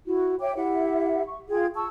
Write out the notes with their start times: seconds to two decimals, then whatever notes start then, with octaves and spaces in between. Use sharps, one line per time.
0.07 E4 F#4
0.40 C#5 E5 G5 D6
0.55 E4 G4 E5 F#5
1.25 C#6
1.49 F4 G#4 G5 G#6
1.75 A5 C#6 E6